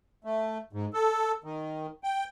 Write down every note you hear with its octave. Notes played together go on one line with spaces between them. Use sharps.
A3
G#2
A4
D#3
G5